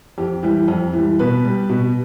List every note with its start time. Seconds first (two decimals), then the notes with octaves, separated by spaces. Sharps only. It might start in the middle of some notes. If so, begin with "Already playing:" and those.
0.18 F2 G4
0.43 E3 G3
0.68 F2
0.93 E3
0.99 G3
1.19 B2 B4
1.44 G3
1.69 B2